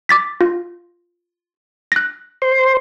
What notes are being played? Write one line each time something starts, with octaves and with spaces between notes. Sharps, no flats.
D6 A6 B6
F4
F#6 A#6
C5 C6